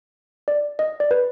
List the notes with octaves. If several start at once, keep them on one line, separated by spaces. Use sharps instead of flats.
D5
D#5
D5
B4